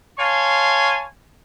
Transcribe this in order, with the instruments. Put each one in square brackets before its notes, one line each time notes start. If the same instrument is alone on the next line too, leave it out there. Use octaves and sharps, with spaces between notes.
[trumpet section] C#5 F5 G#5 A5 C6